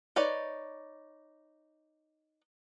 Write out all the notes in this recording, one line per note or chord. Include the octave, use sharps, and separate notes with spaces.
D#4 B4 C#5 D5